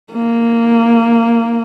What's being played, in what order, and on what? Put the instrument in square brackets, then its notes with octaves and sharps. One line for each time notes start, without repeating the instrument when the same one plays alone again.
[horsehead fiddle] A#3